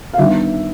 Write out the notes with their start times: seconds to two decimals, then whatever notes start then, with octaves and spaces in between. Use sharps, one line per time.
0.13 F5
0.18 D#3 G3 B3 D4 E5